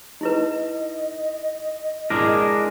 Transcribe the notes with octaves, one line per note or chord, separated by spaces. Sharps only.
D#4 E4 B4 D#5
G#3 D4 E4 A#4